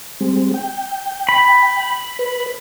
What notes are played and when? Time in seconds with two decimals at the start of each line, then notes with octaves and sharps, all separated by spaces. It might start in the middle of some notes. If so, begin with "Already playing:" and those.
0.21 G3 G#3 C4
0.54 G5
1.29 B5
2.19 B4